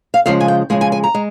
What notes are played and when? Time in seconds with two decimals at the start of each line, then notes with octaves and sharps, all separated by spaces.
0.14 F5
0.26 C#3 F3 G#3 F5
0.40 G#5
0.48 G5
0.70 C#3 F3 G#3 G#5
0.81 G#5
0.92 G#5
1.04 A#5
1.14 G#3